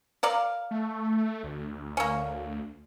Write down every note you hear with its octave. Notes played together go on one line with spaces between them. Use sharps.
A#4 D5 F5
A3
D2
A#3 C#4